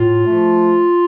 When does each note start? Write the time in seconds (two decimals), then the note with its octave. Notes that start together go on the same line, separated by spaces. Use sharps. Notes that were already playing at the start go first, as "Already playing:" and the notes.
Already playing: A2 F4
0.26 F3 A3